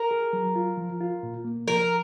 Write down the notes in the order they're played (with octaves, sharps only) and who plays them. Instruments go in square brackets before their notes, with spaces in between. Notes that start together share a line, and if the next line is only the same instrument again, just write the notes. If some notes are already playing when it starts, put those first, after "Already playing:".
Already playing: [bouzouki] A#4
[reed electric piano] G#4
F#3
F4
F3
F4
A#2
A#3
[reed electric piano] F3 [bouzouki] A#4